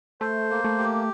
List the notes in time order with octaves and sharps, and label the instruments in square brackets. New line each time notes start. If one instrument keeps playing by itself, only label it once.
[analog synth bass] A3 [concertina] C5
[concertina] A#3
[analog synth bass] A3
[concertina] G4